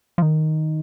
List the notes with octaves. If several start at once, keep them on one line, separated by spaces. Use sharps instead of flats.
F3
D#3